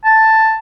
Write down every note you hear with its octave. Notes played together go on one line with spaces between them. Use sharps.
A5